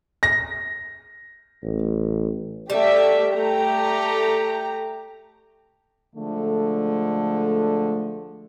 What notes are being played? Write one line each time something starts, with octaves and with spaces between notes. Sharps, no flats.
A#6
A1
G3 A3 G4 E5
A3 G4 A#5
D3 F3 G#3 A3